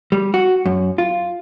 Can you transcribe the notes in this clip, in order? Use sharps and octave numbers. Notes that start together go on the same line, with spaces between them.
G3
F#4
F#2
F4